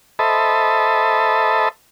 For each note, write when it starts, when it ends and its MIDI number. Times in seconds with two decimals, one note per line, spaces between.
0.19 1.69 69
0.19 1.69 72
0.19 1.69 75
0.19 1.69 76
0.19 1.69 81
0.19 1.69 83